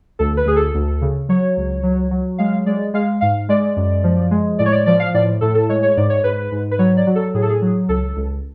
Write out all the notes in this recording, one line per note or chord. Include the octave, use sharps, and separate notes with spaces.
D2 A4
B4
D2 G#4
A4
D2
C#3
F#3 C#5
C#2
F#3
F#3
G#3 F5
G#3 D5
G#3 F5
G#2 F5
G#3 D5
F#2
F3
G#3
A2 D5
C#5
D5
F3 D5
F5
A2 D5
A2 A4
A4
G#3 C#5
C#5
G#2 D5
C#5
G#2 B4
G#2
B4
F#3 C#5
D5
F#3
A4
A2 G#4
A4
G#4
F#3
C#2 A4
C#2